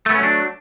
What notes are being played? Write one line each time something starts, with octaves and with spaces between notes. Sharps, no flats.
F#3 A3 B3 C#4 D4